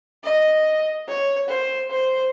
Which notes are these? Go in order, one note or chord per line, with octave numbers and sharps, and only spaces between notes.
D#5
C#5
C5
C5